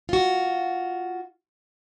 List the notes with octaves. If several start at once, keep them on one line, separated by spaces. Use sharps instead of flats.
F4 F#4